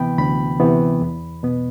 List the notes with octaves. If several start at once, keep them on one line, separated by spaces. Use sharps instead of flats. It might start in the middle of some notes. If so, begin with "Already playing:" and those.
Already playing: D2 C3 E3 B3 G5 B5
D2 B5
C3 E3 B3
E2
B2 B3